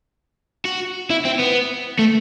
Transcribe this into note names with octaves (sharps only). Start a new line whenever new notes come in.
F#4
E4
C4
B3
A3